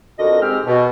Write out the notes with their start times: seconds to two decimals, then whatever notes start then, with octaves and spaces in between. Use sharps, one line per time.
0.19 F2 D3 F#4 A#4 D#5
0.41 G#2 G#3 C4 G4 F6
0.66 B2